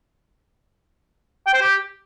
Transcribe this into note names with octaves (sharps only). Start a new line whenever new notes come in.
G5
C5
G4